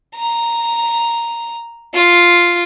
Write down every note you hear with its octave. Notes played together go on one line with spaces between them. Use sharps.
A#5
F4